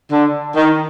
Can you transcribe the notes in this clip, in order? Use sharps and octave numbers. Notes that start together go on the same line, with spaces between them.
D3
D#3